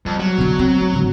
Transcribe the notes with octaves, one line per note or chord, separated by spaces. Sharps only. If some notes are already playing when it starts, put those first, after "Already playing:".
F2 G3
F#3
B2 D3
C4
A3
G#2 D3